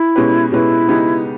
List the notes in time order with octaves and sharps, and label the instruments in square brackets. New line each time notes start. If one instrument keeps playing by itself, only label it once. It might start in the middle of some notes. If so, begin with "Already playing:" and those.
Already playing: [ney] E4
[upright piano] B2 G#3 C#4 G4 B4
[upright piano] B2 G#3 C#4 G4 B4 [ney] E4
[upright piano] C#3 G#3 B3 D#4 G4